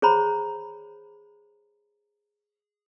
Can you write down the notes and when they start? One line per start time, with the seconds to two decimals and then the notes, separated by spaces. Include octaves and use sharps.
0.02 G#4 C5 C#5 A#5 B5